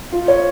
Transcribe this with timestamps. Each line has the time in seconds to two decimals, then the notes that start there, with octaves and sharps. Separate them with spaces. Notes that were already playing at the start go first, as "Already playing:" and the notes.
0.12 F4
0.28 C#5